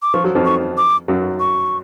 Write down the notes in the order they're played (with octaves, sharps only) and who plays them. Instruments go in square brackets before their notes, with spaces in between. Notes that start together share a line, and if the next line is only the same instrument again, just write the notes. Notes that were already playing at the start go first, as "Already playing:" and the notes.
[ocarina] D6
[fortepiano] F3 [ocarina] C#6
[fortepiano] F#3
F2 F3
[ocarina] C#6
D6
[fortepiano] F#2 F#3
[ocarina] C#6